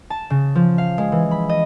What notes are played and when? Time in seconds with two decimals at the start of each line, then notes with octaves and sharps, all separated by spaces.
0.10 A5
0.30 C#3
0.55 F3
0.78 F5
0.98 G#3
1.12 E3
1.31 B5
1.49 D#5